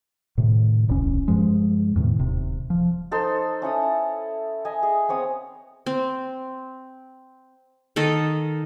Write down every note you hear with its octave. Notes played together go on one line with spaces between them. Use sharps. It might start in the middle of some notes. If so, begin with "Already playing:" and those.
A2 C3 D#3
D1 B1 E2 C#4
G2 F3 G#3
E2 A2 C3 D#3
D#1 C3
F3
D#4 A4 C5 C6
C#4 E4 C#5 D#6
D#5 E5 G#5
G#4
B3 C4 C#5 D#6
C4
D#3 A4 D#5